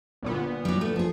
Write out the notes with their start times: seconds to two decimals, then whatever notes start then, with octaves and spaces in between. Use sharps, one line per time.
0.22 G1 A#2 B3
0.65 F#3 G3
0.81 A3
0.96 F3 G#4